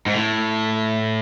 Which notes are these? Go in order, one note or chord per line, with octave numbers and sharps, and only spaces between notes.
G#2
A2